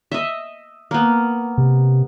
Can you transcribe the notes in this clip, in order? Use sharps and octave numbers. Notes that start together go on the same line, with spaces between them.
D#5 E5
A#3 B3
C3